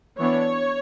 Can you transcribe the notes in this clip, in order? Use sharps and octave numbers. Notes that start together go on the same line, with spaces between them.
E3 B3 D4 C#5